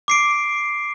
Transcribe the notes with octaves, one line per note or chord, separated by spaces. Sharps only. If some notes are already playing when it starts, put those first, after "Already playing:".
D6 C7 D7